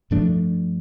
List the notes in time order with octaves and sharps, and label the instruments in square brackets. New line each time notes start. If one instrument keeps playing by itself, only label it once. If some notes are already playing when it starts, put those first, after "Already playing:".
[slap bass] G2 F3 A3 D4